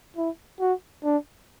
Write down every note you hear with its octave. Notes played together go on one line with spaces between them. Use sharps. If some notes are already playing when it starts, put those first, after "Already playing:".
E4
F#4
D4